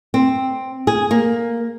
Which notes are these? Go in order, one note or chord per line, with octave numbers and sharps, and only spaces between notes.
C4
G#4
A#3